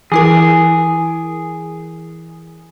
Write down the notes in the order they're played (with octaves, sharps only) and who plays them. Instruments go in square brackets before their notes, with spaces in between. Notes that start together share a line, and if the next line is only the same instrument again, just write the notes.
[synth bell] E3 E4 A#4 [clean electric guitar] G#4